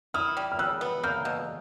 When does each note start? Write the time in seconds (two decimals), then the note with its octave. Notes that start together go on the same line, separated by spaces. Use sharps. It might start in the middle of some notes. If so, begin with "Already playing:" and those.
0.14 E4 D#6 F6
0.37 G3
0.52 F6
0.59 G3 E6 F#6
0.81 B3
1.03 A#3 F6 G6
1.25 B2